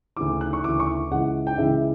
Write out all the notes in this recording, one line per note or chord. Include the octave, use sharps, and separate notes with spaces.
D2 C#3 E3 D6
F#6
C#6
D2 C#3 E3 D6
C#6
C#2 C#3 E3 F#5
G5
C#2 C#3 E3 E5